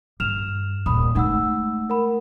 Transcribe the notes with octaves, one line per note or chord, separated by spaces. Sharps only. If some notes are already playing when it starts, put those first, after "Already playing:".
G2 F6 E7 F7
D#1 B5 D#6
G#3 A3 D#4 F#5 E6
A#4 F#5 B5